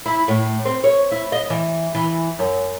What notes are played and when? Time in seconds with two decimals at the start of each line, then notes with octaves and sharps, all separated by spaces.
0.06 E4
0.28 A2
0.65 C4
0.84 C#5
1.11 E4
1.32 D#5
1.50 E3
1.95 E3
2.39 F#2